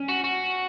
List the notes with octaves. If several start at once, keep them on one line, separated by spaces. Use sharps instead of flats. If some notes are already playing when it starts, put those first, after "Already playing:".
Already playing: C#4
F#4
F#4